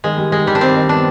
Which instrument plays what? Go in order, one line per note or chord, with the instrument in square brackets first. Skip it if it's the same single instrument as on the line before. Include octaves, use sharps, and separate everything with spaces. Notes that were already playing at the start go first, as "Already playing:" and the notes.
[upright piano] D#3 [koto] G#3
[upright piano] G3
[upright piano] D#3 [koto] G#3
[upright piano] D#3 [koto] G3
[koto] D4
[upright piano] D#3 [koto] C4
[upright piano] D#3
[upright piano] B3 [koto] D4